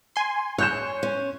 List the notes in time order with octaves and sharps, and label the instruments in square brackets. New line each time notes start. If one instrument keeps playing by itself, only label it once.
[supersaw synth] G#5 C6
[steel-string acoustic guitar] C#5 [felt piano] F#6 G6 E7
[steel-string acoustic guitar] C#4